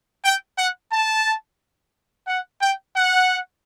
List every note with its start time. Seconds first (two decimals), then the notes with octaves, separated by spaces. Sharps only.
0.24 G5
0.58 F#5
0.92 A5
2.28 F#5
2.62 G5
2.96 F#5